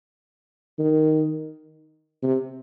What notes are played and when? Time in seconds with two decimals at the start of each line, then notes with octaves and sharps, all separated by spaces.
0.79 D#3
2.23 C3